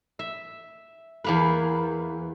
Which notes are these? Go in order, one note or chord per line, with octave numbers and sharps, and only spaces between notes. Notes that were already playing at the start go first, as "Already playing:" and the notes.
E5
E2 A#3 B4